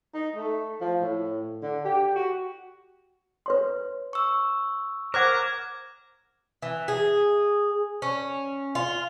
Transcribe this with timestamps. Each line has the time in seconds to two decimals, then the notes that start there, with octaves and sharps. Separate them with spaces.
0.14 D#4
0.36 A3
0.81 F3
1.01 A2
1.62 D3
1.85 G4
2.16 F#4
3.46 B4 C#5 C6
4.13 C#6 E6
5.14 A#4 C5 F#5 D6 F#6 G#6
6.62 E3
6.88 G#4
8.02 C#4
8.75 F4